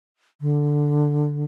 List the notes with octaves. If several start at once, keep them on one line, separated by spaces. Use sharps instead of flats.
D3